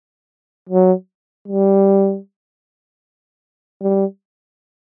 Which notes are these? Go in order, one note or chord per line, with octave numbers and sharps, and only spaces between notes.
F#3
G3
G3